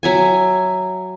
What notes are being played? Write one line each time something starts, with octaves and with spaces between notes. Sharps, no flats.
F#3 E5 G#5